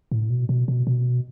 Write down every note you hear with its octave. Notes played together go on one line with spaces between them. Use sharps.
A2
B2
B2
B2
B2